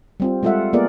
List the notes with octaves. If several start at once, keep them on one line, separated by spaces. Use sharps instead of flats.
G3 C4 F4
G3 G#3 F4 A4 E5 F#5
A#3 B3 F4 G#4 A#4 D5